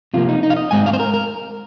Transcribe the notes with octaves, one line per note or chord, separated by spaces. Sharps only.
C3 F3 A#3 F4
D#4
D#4
F5
D#5
G#2 G#3 C4 G#5
F5
C5
A#4
A#4